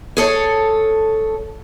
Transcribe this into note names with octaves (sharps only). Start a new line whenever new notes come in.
G#4 A4 C#5